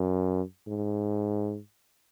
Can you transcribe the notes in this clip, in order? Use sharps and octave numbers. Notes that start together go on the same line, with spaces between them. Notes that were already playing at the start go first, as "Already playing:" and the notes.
Already playing: F#2
G#2